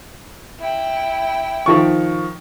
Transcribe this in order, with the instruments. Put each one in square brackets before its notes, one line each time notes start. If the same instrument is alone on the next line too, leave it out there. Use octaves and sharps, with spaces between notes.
[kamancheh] E4 G5
[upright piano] D#3 F3 C#6